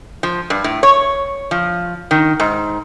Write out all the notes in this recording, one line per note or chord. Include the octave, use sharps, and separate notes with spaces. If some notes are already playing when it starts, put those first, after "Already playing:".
F3
G2
A2
C#5
F3
D#3
G#2